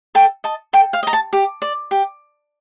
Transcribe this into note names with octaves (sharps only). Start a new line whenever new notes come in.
A4 G5
D#5 A5
A4 G5
F5
D#5 A#5
A5
G4
D5
G4